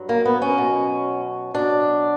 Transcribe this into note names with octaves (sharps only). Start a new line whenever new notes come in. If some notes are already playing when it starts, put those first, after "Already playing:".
Already playing: G2 F#3
A#3
B3
C#4
B2 F#3
B2 F#3 D4